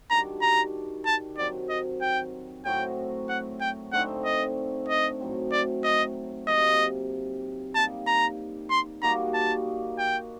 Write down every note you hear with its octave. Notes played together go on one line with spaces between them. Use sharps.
D#3 G3 D4 F#4 A#5
A#5
A5
D#3 F#3 C4 D5
D#5
G5
A2 F#3 C4 F#4 G5
F#5
G5
D3 A3 C4 D#4 F#5
D#5
D#5
A2 F#3 C4
D5
D#5
C3 F#3 A#3 D#5
G3 A#3 D#4 A5
A#5
C6
G3 A#3 D#4 F#4 A#5
A5
G5